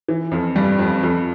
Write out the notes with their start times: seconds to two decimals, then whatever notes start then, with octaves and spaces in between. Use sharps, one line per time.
0.08 E3
0.31 F2 F3
0.56 G2 G3
0.79 F2 F3
1.03 F2 F3